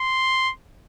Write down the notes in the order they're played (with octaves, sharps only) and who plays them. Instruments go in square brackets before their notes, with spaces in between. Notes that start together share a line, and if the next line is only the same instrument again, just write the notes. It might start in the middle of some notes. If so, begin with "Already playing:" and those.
Already playing: [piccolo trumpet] C6